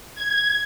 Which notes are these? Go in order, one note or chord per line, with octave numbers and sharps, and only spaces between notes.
G#6